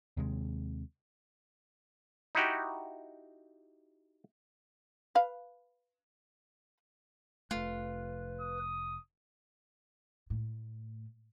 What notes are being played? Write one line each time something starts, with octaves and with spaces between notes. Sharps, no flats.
D#2 C3 G#3
D#4 E4 F#4 G4
B4 F5
F1 A3 F4 B4
D#6
A2